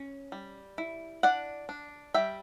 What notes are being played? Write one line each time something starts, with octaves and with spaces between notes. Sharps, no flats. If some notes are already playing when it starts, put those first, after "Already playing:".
Already playing: C#4
G3
E4
D4 D5 F#5
D4
G3 E5 G5